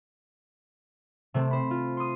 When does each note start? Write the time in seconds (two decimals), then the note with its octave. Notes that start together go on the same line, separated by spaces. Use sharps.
1.34 C3 A3 C4
1.51 C5 B5
1.71 F4
1.97 C6 D#6